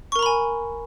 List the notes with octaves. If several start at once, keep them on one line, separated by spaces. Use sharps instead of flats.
A#4 G#5 A#5 B5 C#6